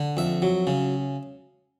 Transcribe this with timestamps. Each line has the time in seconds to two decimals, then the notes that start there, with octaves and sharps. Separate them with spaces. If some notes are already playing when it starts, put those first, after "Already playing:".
Already playing: D3
0.17 F2 E5
0.42 F#3
0.67 C#3